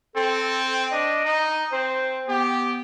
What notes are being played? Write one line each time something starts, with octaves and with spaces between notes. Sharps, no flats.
C4 A4
D4 D#5
D#4
C4 C5
B3 G4